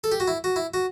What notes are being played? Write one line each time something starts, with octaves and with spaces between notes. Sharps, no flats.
A4
G4
F#4
E4
F#4
E4
F#4